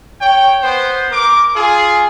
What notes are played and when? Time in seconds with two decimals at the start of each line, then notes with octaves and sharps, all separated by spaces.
0.19 C#5 G5
0.62 B3 C5
1.11 A#4 D6
1.54 F4 G#4